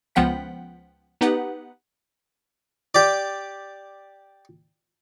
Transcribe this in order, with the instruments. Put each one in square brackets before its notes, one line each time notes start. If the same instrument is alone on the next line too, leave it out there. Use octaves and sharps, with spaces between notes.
[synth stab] C#2 F3 B3 F#5 G5 B6
B3 D#4 G4 B4 F#5
[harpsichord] G4 D5